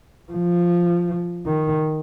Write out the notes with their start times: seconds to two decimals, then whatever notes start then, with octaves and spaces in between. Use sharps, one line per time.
0.32 F3
1.46 D#3